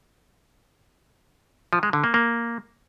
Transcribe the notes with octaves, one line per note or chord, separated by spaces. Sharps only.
F3
G#3
D3
A#3
A#3